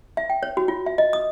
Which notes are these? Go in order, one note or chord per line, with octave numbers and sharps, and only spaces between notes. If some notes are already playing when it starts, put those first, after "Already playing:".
E5
G5
C#5
F#4
F4
E5
D#5
D#6